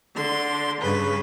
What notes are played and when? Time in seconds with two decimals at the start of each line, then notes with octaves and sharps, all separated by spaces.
0.14 D3 C6
0.81 G2 C#3 B4